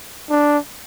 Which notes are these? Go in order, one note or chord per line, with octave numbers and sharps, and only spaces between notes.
D4